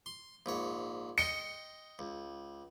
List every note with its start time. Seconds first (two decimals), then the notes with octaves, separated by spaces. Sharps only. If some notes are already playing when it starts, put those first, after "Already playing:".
0.06 C6
0.46 A#1 G#2 C#5
1.18 D#5 G5 C6 C#7
1.99 C#2